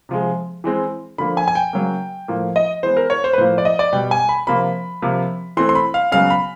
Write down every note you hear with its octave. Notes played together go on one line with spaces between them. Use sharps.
C3 F3 G#3
E3 G#3 C4
D3 F3 A#3 B5
G#5
G#5
G5
C#3 F#3 A#3
A2 F3 A#3
D#5
E3 G#3 B3 C5
A#4
C#5
C5
B4
A2 F3 A#3 C5
D5
D#5
D5
B2 G3 B3 G5
G#5
B5
C3 F3 A#3 B5
C3 F3 A#3
E3 A3 C4 C6
C6
B5
F5
C#3 F#3 B3 F5
B5